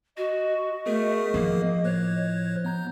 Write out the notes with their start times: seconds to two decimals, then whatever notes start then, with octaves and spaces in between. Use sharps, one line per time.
0.17 F#4 D#5
0.86 A3 B3 G#4 A#4
1.34 F3 A#3
1.84 A2 C5 C#5 F#6
2.64 B3 A#5 G6